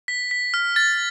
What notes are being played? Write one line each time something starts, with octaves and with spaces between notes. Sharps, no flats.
B6
B6
F6
A6